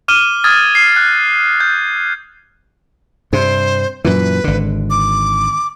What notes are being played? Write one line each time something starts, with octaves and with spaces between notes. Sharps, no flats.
D6 F6 D#7 G7
D#6 F6 G#6 A6
C7
F#6
G6
G2 C3 C5
F#2 A#2 E3 B4
G#1 D3
D6